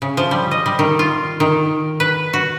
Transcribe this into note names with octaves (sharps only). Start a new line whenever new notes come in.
C#3
F3
G3
D#5
G3
D#3
F4
D#3
B4
F#4